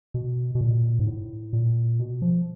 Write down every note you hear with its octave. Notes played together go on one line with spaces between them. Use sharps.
B2
B2
A#2
G#2
A2
A#2
B2
F3